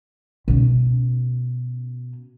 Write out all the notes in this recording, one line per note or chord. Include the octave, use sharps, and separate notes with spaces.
B2 C#4